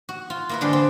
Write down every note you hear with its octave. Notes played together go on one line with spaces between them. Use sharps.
F#4
F4
A#3 E4 B4
D3 G3 G#3 D4 C5
C4